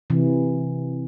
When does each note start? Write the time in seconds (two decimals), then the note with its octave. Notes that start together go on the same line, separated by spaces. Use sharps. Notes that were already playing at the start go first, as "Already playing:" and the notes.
0.10 C3 E3